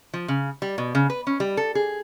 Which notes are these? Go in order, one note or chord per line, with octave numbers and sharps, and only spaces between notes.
F3
C#3
G3
B2
C#3
B4
C#4
G3
A4
G#4